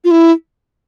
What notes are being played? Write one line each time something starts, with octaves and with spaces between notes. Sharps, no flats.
F4
E4